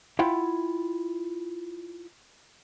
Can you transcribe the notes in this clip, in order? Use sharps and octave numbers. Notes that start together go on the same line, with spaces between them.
E4 F4 E5 F#5 G5